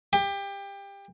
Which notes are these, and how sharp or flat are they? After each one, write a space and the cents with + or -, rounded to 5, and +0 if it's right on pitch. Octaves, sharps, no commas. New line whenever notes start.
G4 +25